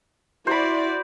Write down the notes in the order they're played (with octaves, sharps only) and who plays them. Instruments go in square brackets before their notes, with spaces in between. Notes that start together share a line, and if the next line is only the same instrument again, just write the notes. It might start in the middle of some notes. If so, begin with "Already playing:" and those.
[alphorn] E4 [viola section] F#4 D5 [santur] C5 B5